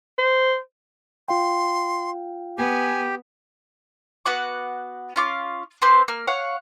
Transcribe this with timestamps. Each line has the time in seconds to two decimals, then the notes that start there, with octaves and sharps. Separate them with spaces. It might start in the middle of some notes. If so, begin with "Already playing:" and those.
0.18 C5
1.28 F4 F5 G5 C6
2.58 B3 G4 G#5
4.25 B3 F#4 F#5 D6
5.16 C#4 F4 D6
5.82 C4 B4 C5 D6
6.08 A#3 F6
6.27 C#5 F5 F#5